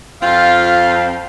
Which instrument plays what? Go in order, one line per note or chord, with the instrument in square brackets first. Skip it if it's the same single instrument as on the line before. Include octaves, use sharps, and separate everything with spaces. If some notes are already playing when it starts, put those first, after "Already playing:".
[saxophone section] F2 C4 F5 [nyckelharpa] F4